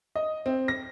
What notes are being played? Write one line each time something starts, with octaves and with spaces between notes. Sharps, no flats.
D#5
C4
A#6